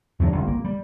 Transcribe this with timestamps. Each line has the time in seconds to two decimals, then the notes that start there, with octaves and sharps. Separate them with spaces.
0.20 E2 F#3 A#3 D4
0.32 G1 C2
0.47 A#3
0.64 G3